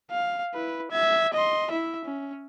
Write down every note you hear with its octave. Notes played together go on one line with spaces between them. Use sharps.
F5
E4 B4
E5 G#6
D#5 C6
E4 E5
C#4